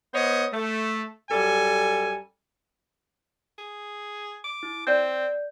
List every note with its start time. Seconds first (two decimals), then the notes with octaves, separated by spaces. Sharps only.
0.14 B3 C5 C#5 D#5
0.53 A3
1.31 F#2 G3 A4 G#5
3.58 G#4
4.44 D6
4.63 E4
4.87 C4 D5 G6